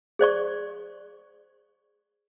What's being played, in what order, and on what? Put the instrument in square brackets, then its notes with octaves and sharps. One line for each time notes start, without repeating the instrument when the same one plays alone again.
[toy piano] G#4 C5 D5 C#6